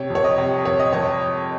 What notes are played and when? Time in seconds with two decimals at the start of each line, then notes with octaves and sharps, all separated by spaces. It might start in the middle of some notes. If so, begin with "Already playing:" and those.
Already playing: C3 C#5
0.10 F2
0.15 C#5
0.24 D#5
0.38 C3
0.65 F2 C#5
0.79 D#5
0.93 F2 C#5